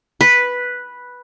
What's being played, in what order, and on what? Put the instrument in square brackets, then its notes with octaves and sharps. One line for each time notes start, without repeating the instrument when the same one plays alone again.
[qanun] B4